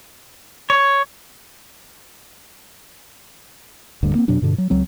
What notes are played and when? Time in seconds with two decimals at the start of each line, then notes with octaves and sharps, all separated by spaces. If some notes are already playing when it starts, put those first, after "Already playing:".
0.70 C#5
4.03 D1 D2 G2 D3
4.15 A#3 C4
4.28 F2 B2 F#3 D4
4.42 G2 B2 D3
4.58 F#3
4.70 C#2 F#3 C4